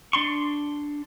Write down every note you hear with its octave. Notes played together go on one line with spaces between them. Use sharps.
D4 C6 C#6